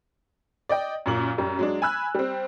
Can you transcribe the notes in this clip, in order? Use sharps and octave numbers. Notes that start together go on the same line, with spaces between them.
D5 D#5 G5
F#2 A#2 F#7
F#2 G3
F#3 G#3 D4
G#5 B5 E6 F#6
G3 C4